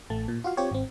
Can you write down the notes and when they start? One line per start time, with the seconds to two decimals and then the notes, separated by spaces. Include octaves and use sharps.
0.10 A1 A3 A5
0.28 A#2
0.44 F4 F#4 F5
0.57 C4 F4 G4 C#5
0.71 G#1 C4